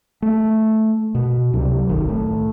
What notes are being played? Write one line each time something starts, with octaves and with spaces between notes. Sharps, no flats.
A3
B2
C#2 C3 F#3
F#1 B1 D#3
A2